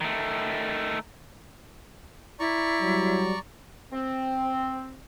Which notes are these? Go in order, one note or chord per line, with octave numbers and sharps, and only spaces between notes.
D#3 A3
E4 D5 A#5 C#6
F#3 G3
C4